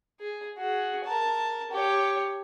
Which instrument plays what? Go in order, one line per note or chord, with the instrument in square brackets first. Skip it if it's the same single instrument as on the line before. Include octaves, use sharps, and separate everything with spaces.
[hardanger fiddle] G#4
F#4 G#4
A#4 A5
G4 C#5